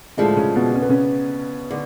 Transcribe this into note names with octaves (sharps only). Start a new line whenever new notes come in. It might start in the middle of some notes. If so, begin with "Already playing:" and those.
A2 D3 F3 G#3 D4
C#3 C#4
B2 B3
C#4
B3
C#3 C#4
D3